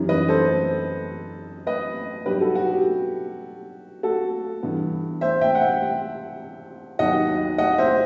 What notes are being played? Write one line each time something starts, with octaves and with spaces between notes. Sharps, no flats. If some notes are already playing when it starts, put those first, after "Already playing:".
Already playing: F#2 E3 G3 D#4
B4 D#5
A4 C5
B4 D#5
G2 F#3 B3 D#4 G4 B4
F#4 A4
F#4
G4
F#4 A4
G2 E3 B3
C5 E5
E5 G5
F#5
E5 G5
D#2 D#3 F#3 B3 D#5 F#5
D#5 F#5
C5 E5